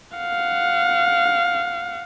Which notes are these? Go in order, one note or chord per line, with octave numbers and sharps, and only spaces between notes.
F5 F#5